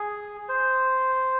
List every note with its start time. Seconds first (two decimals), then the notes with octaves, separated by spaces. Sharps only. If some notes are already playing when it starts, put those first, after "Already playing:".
Already playing: G#4
0.49 C5